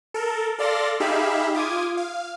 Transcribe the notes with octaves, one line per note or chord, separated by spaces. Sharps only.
A4 A#4
A4 D5 F5 C6 A#6
D#4 G4 G#4 E5 F5 B5
F4 D6 D#6 G#6
F5